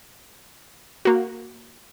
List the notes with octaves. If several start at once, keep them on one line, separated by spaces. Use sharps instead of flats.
A#3 F#4